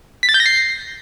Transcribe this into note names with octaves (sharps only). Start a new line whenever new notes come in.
B6
A6
G6
A#6
C7